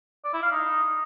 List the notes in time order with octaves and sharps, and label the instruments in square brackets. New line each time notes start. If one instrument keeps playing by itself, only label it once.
[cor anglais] D5
E4
F5
D#4